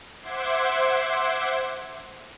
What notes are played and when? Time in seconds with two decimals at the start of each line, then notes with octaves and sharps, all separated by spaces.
0.19 C5 E5 F#5 C6 D6 G#6